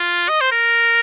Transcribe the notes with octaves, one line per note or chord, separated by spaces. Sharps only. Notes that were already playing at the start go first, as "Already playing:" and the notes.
Already playing: F4
D#5
C5
A#4